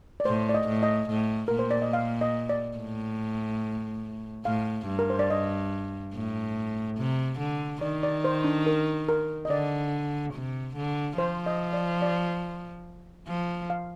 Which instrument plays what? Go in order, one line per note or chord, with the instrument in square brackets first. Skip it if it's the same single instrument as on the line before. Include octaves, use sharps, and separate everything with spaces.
[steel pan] D5
[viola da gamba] A2 [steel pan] C5
[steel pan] D5
D#5
[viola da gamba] A2
[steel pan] D#5
[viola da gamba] A2
[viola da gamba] A#2 [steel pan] A#4
[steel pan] C5
D5
D#5
F5
D#5
D5
[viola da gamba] A2
[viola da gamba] A2 [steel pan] F5
[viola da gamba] G2
[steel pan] A#4
C5
D5
D#5
[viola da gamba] A2
C3
D3
[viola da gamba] D#3 [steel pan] D5
[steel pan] D5
C5
D4
A#4
A#4
D#5
[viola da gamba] D3 [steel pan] D5
[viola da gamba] C3
D3
[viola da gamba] F3 [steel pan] C5
[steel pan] D#5
D5
D5
[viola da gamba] F3
[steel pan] F5